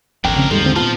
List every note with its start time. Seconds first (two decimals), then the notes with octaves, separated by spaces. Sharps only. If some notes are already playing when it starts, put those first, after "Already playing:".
0.25 G#1 F2 D4 A#4 G5
0.37 C#3 C4
0.51 D#2 G#2 F3 G3 A4
0.63 D3 C4
0.76 A#2 F3 B3 F4 A5